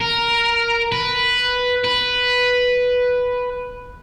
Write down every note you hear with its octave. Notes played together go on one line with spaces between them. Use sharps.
A#4
B4
B4